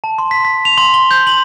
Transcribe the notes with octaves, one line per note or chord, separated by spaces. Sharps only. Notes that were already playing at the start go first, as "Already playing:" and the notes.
A5
C6
B6
B6
F7
C6
G7
G6
F#7